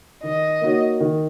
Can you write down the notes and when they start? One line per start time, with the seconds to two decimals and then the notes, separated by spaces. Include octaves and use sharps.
0.23 D#3 D#5
0.61 A#3 D#4 F#4 C#5
1.00 D#3